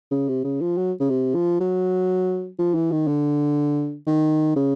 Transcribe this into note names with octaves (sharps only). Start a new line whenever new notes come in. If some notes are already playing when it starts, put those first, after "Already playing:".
C#3
C3
C#3
F3
F#3
C#3
C3
F3
F#3
F3
E3
D#3
D3
D#3
C#3